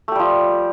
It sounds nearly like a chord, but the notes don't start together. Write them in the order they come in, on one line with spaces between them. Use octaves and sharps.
A3 G4 G3 F3